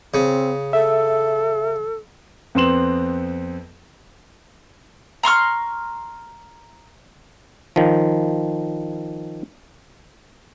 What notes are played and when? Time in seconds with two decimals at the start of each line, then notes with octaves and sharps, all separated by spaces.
0.14 C#3 C4
0.73 A4 E5
2.55 F2 B3 C4 C6 E7 F#7
5.23 A#5 C6 C#6 F6
7.76 D#3 F3